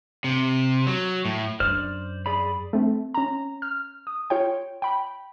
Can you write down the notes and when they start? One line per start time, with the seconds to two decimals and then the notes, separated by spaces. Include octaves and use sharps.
0.24 C3
0.87 F#3
1.25 A2
1.60 F#2 D4 C5 D5 F6
2.26 G#4 D5 B5
2.73 A3 C4
3.14 C#4 A#5
3.62 F6
4.07 D#6
4.30 F4 C#5 G5
4.82 G5 B5